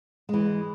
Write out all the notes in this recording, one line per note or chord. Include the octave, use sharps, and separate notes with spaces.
E3 G#3